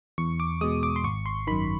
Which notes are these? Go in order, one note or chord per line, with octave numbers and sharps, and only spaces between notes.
E2 C#6
D6
B2 G#3 D#6
D6
C6
G#1 C#6
C6
F#2 D#3 B5